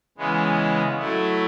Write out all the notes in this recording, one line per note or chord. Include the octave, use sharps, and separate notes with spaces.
C#3 E3 G#3 B3
F#3 A3 E4